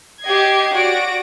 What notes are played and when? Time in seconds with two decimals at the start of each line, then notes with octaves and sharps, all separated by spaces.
0.25 G4 D#5 G#6 C7
0.75 F#4 D5 A#6 D7